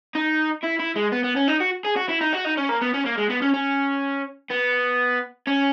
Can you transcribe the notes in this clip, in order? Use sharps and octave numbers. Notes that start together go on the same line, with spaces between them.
D#4
E4
E4
G#3
B3
B3
C#4
D#4
F#4
G#4
F#4
E4
D#4
F#4
D#4
C#4
A#3
B3
C#4
A#3
G#3
B3
C#4
C#4
B3
C#4